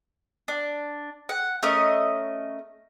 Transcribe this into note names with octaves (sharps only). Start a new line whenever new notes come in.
D4
F#5
A3 C#4 A#4 D#5